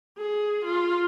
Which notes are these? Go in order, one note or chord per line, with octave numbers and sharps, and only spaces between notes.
G#4
F4